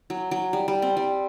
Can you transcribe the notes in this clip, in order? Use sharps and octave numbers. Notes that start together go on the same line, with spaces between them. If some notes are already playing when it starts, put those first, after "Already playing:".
F#3
F#3
G3
G3
C4
G3